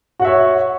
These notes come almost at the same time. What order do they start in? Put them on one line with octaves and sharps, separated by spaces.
F#4 F#5 E5 C#5